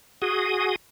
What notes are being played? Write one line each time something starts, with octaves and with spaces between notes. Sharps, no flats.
F#4 G#4 D#6